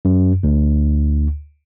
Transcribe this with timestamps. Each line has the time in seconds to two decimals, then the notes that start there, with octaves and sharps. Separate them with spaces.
0.05 F#2
0.43 D2